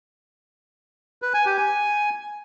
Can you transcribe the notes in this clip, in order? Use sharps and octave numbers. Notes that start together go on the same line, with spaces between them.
B4
G#5
G4
G#5